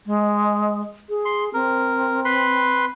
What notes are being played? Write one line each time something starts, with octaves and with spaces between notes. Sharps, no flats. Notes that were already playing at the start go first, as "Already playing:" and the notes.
G#3
G#4
C6
C4 A#4
B4 B5 C6